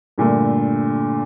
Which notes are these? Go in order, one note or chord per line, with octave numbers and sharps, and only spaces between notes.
G2 A#2 D3 A3